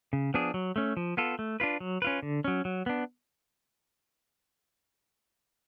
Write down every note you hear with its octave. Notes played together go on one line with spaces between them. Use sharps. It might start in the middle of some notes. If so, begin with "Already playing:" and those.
C#3
F3 B3 D4 G#4
F#3
A3 C#4
F3
B3 F4 A4
A3
D4 F4 B4
F#3
C#4 F4 B4
D3
F#3 C#4
F#3
B3 D4